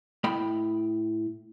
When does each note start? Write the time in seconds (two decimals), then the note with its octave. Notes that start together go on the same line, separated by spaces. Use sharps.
0.24 A2 D#5 G5 B5